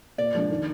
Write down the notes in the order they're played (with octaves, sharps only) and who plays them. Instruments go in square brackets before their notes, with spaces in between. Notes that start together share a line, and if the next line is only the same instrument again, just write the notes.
[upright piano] A#2 [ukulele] D5
[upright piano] F3 G#3 D4
D#3